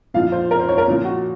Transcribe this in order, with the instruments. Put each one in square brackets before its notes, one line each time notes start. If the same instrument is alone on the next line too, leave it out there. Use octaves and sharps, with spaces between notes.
[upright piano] A#2 F3 F5
C5
A#4
C5
C#5
A#4
A#2 F3
F#4